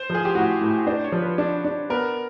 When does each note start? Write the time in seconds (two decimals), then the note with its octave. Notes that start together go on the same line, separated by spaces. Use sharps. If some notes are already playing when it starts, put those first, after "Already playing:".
Already playing: C5
0.10 F3 G#4
0.25 G4
0.35 A2 F#4
0.61 A2
0.87 D4 C5
1.04 C#5
1.12 F3
1.21 B4
1.38 D4
1.65 D4
1.90 B3 A#4